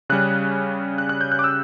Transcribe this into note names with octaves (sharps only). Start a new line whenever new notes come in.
C#3 G3 C#4 F#6
F#6
F#6
G6
F#6
D6
E6